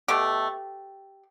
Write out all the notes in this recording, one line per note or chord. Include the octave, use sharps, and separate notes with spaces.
B2 A3 G4